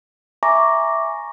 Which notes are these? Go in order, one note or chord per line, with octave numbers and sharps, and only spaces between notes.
E5 G#5 A#5 C#6 D6 A#6